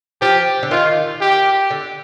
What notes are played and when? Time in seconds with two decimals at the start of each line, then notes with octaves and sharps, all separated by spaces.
0.22 F3 G4
0.63 D3
0.71 D#3 F4
1.21 G4
1.71 D3